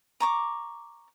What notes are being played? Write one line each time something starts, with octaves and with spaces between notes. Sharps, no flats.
A#5 C#6 D6